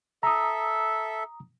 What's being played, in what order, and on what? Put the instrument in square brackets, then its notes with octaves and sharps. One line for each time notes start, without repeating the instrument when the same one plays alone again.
[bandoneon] A4 E5 [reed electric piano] A#5 D#6